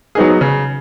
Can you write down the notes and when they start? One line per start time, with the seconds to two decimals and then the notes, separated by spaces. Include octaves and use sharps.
0.15 F#3 B3 D#4 G#4
0.41 C#3